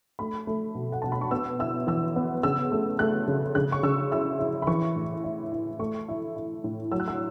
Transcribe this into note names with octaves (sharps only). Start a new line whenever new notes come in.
A3 B5
A3
B2
F#5
B2 A5
B5
C#6
B3 E6
E4 E6
E3 E6
B3
C#3 E6
A3
A3 F#6
C#3
C#3 F#6
C#6
C#3 E6
E4 E6
E4
B5
E3 C#6
A2
E4
E4
A3 C#6
E4
E4
A2
F#3 E6
F#6
E6